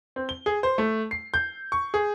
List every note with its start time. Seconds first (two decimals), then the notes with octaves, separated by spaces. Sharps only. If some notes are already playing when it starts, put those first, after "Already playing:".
0.16 C4
0.29 G7
0.46 G#4
0.63 C5
0.78 A3
1.11 C7
1.34 G6
1.72 C#6
1.94 G#4